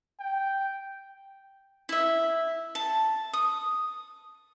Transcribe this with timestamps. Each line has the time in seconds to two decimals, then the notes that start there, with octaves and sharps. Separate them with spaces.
0.19 G5
1.89 E4 E5
2.75 A5
3.33 D#6